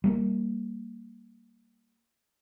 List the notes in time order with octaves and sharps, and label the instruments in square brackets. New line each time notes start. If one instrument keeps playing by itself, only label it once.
[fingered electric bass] G3 A3 A#3